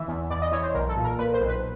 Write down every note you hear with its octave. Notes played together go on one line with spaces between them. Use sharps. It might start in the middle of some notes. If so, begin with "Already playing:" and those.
Already playing: E3 E5
E2
E2 D5
D#5
E3 C#5
C5
B1 A#4
A4
A#2
A#4
A#2 B4
C5
B1
B4